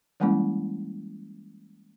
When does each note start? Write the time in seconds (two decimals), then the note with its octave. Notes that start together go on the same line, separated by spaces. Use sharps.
0.20 E3 G3 G#3 A#3 C#4 E4